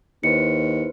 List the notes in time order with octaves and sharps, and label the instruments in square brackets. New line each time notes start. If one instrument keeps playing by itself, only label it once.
[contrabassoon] D#2 [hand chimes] E4 B4 C5 [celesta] C#7